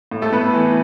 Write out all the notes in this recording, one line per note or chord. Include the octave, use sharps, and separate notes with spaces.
A2
A3 A4
A2 B3 B4
E3